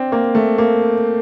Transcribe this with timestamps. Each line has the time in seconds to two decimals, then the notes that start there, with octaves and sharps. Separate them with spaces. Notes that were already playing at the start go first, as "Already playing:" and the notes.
Already playing: C4 D4
0.12 A#3
0.35 A3
0.58 A#3